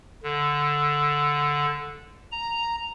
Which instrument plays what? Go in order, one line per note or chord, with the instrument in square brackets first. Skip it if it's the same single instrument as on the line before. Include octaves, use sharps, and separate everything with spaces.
[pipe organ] D3
A#5